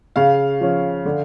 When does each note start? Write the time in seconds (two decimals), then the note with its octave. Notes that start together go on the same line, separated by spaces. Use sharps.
0.16 C#3 F5
0.61 F3 C#4
1.05 D3